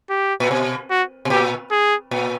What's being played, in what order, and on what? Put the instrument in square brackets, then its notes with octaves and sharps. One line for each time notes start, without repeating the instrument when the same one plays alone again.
[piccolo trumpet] G4
[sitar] A#2
B2
[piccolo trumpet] F#4
[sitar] B2
[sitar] A#2 [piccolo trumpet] G4
[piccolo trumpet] G#4
[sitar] A#2